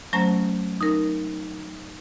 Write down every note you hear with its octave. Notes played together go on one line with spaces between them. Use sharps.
F#3 A3 C#4 C5 A#5 A#6
D#4 A#4